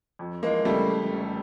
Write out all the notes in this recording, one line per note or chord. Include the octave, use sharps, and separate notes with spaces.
F2
E3 G#3 A#3
C#3 G3 A3
F2
F1